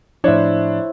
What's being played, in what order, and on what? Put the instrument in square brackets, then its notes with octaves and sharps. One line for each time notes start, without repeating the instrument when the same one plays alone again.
[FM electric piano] A2 F3 [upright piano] D4 [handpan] E4 C5 [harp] C#5 E5